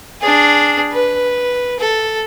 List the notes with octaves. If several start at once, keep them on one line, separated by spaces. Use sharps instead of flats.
D4 G#4
B4
A4